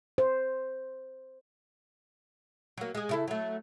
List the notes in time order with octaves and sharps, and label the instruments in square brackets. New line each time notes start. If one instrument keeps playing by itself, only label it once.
[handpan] C5
[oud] F#3 A#3
G#3 G#4
C#3 E4 A4
F#3 A3